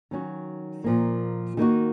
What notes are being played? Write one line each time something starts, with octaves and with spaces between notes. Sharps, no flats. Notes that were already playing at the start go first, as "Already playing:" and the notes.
D#3 F#3 C#4 F#4
A#2 F3 A#3
D#3 A#3 D#4 F#4